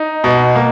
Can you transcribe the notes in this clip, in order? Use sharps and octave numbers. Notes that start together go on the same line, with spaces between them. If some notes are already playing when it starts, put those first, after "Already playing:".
Already playing: D#4
B2
A#3